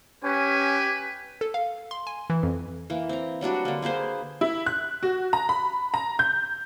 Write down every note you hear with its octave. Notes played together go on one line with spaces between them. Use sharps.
C#4 G4 B4 G#5
A4
F5
C6
G#5
E3
F2
E3 A#3
C4 A#5
F#3 G3 D4 F#4
D3 A#3
A#3 G#4 B4 C5
E4
F#6
F#4
A#5
B5
A#5
G6